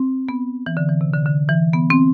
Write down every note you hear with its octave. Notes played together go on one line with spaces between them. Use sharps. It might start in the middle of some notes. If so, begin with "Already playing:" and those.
Already playing: C4
B3
E3
D3
E3
C3
D3
D3
E3
B3
C4